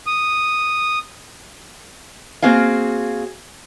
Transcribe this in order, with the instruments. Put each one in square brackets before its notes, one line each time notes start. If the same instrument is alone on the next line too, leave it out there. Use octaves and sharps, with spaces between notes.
[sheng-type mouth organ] D#6
[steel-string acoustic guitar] A#3 C4 F#4 G#4 F5